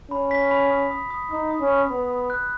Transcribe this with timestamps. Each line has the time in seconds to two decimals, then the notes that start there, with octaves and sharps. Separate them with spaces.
0.11 C#4 B5
0.31 B6
0.51 B5
0.70 D#6
0.91 D#6
1.11 D#6
1.31 D#4 D#6
1.51 D#6
1.61 C#4
1.70 B5
1.90 B3 B5
2.10 B5
2.30 F#6